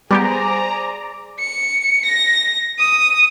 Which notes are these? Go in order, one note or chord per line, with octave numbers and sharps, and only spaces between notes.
G3 B3 G4 G#4 C5 D5 A#5
C#7
A#6
D#6